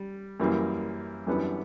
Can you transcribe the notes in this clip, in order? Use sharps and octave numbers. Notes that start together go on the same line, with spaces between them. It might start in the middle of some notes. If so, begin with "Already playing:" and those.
Already playing: G3
F#2 E3 G3 A#3
F#2 E3 G3 B3 D4